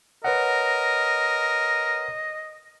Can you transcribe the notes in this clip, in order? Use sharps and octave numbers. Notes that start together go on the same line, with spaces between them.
A#4 B4 C#5 D#5 F#5